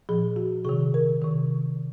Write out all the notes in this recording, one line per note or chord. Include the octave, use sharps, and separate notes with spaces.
A#2 F3 G#4
F#4
C3 D#3 G#4
A#4
C3 D#3